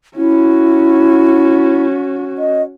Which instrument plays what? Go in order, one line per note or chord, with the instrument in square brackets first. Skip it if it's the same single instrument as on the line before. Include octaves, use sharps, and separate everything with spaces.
[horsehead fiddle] C#4 F#4 [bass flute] E4
[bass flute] D#5